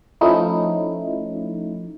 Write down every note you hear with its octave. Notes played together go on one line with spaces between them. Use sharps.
F3 A3 C#4 D#4 E4